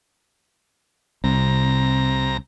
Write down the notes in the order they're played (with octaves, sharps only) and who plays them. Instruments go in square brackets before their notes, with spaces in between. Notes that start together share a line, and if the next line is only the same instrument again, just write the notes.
[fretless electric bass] C2 [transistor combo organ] C3 A#5